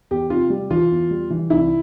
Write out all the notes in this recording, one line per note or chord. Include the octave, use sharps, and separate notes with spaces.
E2 G4
C3 F4
G3
E3 F4
E2
G3
E3
C2 E4